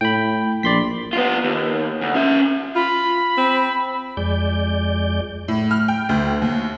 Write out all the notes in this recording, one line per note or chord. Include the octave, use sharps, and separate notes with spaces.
A2 G5 B5
A#1 D5 C6 B6
B3 F4
D#2
D2
C#4 E5
F4 B5
C4
F2 G#3 D5 G6
A2
F6
G5
D2
D#2